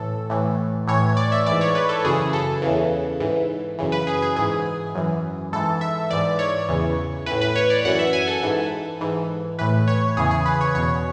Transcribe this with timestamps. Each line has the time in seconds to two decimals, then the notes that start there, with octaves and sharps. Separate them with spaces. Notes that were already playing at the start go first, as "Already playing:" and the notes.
Already playing: A2 E3 A4
0.30 A2 E3
0.87 A2 E3 C#5
1.17 D5
1.32 E5
1.46 G#2 E3 D5
1.61 C#5
1.75 B4
1.89 A4
2.05 F#2 C#3 E3 G#4
2.33 A4
2.62 E2 C#3 E3
3.20 G#2 E3
3.78 F#2 C#3 E3
3.92 B4
4.07 G#4
4.22 G#4
4.36 G#2 E3 G#4
4.95 F#2 E3
5.52 G#2 E3 A4
5.81 E5
6.10 G#2 E3 D5
6.39 C#5
6.68 E2 C#3 E3
7.26 A2 E3 B4
7.41 B4
7.56 C#5
7.70 D5
7.85 F#2 E3 F#5
7.99 E5
8.13 G#5
8.27 A4
8.43 G#2 E3
9.01 G#2 E3
9.59 A2 E3 B4
9.88 C#5
10.17 E2 C#3 E3 G#4
10.31 G#4
10.46 B4
10.61 C#5
10.75 E2 B2 C#5